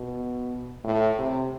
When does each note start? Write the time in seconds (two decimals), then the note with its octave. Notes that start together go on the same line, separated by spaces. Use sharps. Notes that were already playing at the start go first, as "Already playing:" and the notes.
Already playing: B2
0.84 A2
1.18 C3